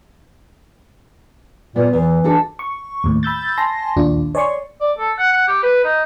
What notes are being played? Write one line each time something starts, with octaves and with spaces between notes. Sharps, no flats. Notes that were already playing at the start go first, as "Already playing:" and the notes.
A#2 B3
E2 E3
D4 F#4 A4
C#6
D#2 A2
B5 E6 G6 A6
G#5 A5 C6 A#6
A#1 D#2 D4 F4
C#5 D5 G#5 C6 C#6
D5
A4
F#5
F#5
G4
B4
D#4